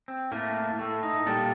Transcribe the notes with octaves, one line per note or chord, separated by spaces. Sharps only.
C4
A2 A3 A#3
A2 A3
D#4
A#2 G3 A#3 A4